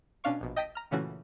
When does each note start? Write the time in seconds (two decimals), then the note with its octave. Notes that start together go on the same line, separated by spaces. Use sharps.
0.24 B2 C#4 D4 F5 C#6
0.41 A#1 B2
0.56 D#5 G5 A5 D#6 B6
0.75 A#5 F6
0.91 A#2 C#3 E3 A3 C#4 F#4